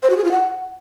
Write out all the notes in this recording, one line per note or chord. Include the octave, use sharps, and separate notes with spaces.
C5
F#4
G#4
F4
F#5